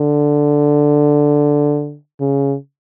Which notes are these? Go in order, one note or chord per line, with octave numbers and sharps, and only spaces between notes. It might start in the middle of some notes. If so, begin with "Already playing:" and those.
Already playing: D3
C#3